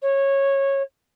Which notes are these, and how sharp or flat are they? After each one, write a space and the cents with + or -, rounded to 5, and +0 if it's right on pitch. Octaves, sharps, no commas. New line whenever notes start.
C#5 -15